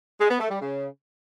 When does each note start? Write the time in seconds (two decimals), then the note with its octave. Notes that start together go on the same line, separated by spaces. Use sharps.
0.19 G#3
0.29 B3
0.40 A3
0.50 G3
0.61 C#3